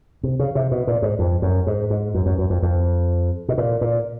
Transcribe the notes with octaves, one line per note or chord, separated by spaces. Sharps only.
C3
C#3
C3
B2
A#2
G#2
F2
F#2
G#2
G#2
F#2
F#2
F#2
F2
F2
B2
A#2
A#2